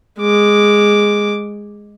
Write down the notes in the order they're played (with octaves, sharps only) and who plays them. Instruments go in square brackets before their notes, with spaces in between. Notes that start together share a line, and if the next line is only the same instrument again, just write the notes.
[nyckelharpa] G#3 D6